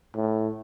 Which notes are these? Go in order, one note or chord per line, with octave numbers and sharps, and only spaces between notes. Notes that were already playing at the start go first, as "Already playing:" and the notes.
A2